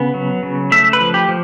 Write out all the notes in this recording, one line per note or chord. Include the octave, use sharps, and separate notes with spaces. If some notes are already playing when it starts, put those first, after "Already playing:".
Already playing: C#3 B3
F#3
C#3
A3 E5
B4
F3
G4
F3